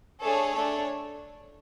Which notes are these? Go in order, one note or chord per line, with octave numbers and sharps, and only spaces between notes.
A3 D4 G#4 A4 C#5
A3 D4 A4